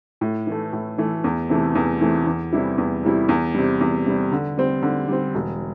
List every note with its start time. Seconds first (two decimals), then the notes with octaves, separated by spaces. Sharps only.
0.21 A2
0.47 E3 A3
0.73 A2
0.98 E3 A3
1.24 E2
1.50 C3 E3 A3
1.75 E2
2.01 C3 E3 A3
2.27 E2
2.53 C3 E3 G3 E4
2.78 E2
3.03 C3 E3 G3 E4
3.29 E2
3.55 C3 G3
3.81 E2
4.06 C3 G3
4.32 D3
4.57 G3 C4
4.83 D3
5.08 G3 C4
5.35 E1